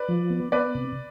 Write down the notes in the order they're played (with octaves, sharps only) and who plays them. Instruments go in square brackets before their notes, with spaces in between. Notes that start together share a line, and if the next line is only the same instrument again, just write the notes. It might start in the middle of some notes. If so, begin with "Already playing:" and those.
Already playing: [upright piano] B4 D5
[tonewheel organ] F3
B3
[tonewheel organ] B3 [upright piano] B4 D5
[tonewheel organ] C3